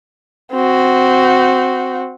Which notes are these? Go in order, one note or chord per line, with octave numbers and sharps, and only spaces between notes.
C4 F#4